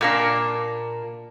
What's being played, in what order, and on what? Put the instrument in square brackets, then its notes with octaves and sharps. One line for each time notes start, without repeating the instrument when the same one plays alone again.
[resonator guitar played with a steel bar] A#2 A#3 D4